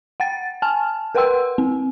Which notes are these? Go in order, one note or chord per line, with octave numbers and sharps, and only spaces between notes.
F#5 G5 A6
G#5 A5 F6
A#4 B4 F#5 G5 C6 E6
C4